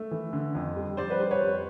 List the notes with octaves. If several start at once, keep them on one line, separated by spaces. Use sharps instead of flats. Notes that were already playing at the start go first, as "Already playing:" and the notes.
Already playing: A3
E3
D3
F2
G3
G3 C5 D5
B4
G3 C5
B4 C#5
F2